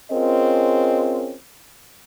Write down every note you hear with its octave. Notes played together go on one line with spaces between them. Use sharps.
C4 C#4 F4 G#4 A#4 D#5